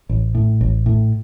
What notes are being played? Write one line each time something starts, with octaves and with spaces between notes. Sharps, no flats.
A1
A2
A1
A2